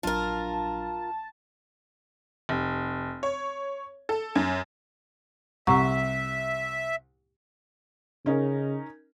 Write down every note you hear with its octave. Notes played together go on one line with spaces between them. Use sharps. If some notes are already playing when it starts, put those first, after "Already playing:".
A#1 F#3 D4 F4 A#4 A5
F1
C#5
A4
F#2
C2 E5 F#5 A#5 C#6
C#3 C#4 D#4 A#4